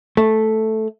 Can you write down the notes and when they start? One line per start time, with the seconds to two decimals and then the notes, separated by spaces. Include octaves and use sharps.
0.17 A3